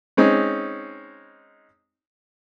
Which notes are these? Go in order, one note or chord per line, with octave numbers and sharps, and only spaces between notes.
G#3 C4 C#4 D#4